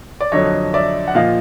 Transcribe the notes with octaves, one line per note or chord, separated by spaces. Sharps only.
D5
F2 D3 F#3 C#5 D#5
D5 E5
F#5
A#2 F3 D#5 F5